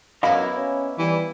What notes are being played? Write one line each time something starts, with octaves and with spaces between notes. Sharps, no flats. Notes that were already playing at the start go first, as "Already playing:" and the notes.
F#2 A#3 B3 E4 D#5 F5 B5
C#4
E3 G3